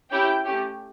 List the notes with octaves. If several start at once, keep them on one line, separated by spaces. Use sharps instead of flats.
C#4 E4 G4 G5
A3 C#4 G4